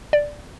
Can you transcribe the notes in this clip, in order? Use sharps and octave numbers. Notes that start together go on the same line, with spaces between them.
D5